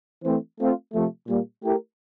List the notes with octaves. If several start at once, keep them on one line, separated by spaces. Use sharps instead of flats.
E3 A3 C4
A3 C4 F4
C3 F3 A3
A#2 G3 A#3
A3 E4 G4 A#4